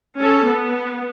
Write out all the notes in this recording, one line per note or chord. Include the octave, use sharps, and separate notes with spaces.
C#4 A4
B3